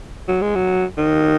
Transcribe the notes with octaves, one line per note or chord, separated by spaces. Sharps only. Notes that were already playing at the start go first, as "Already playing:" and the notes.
F#3
G#3
F#3
D#3